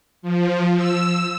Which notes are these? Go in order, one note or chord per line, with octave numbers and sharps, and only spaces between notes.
F3
E6